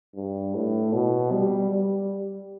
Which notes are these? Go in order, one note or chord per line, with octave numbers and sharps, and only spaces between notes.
G2
A2
B2
G3
G3